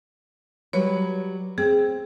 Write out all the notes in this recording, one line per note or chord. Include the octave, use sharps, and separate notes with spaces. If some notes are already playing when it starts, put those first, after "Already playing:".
F#3 G3 B4 C#5
C4 G#4